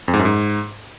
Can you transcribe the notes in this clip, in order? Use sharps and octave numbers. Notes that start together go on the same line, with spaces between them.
F2
G#2
F#2
G#2